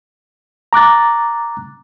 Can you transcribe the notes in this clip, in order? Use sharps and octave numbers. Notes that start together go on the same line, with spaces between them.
A#5 D6 F#6 A6